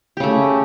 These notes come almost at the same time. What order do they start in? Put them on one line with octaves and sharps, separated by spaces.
G4 C#3 A3